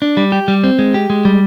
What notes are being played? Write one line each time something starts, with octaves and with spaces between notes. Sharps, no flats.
D4
G3
G4
G3
C4
G#3
G4
G#3
G3